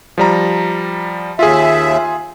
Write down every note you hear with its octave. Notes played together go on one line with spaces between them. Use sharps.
F3 G3 A#5
D#2 F4 G#4 E5